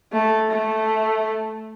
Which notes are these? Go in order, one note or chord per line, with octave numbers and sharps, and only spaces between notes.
A3
A3